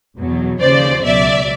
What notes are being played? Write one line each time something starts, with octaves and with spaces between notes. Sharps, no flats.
E2 B2 F#3
D#2 C#3 F3 C5 D5
C#2 B2 F#3 D5 E5